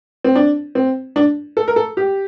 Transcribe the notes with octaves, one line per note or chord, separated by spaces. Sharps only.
C4
D4
C4
D4
A4
A#4
A4
G4